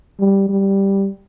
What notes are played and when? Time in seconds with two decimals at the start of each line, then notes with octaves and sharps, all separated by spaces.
0.20 G3
0.49 G3